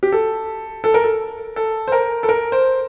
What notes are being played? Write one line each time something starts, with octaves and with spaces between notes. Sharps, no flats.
G4
A4
A4
A#4
A4
A4
C5
A#4
A4
A#4
C5